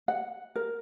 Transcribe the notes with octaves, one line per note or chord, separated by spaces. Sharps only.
F#5
A#4